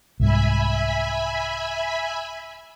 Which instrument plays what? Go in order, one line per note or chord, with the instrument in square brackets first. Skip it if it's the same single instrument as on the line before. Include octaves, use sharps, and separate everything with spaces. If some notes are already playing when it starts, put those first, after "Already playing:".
[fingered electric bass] C2 G#2 [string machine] E5 G#5 B5